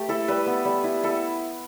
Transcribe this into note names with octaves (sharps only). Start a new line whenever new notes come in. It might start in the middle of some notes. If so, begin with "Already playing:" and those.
Already playing: A3 G4 B4
E4 A4
G3 B4
B3
G3
E4
E4 A4